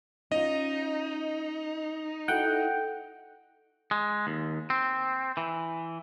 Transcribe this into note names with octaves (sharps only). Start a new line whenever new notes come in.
C#4 D#4 F4 D#5
E4 F#4 A4 F#5 G5
G#3
D#2
C4
E3